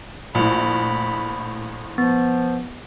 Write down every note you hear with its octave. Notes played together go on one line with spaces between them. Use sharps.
A#1 A2 B5
F3 B3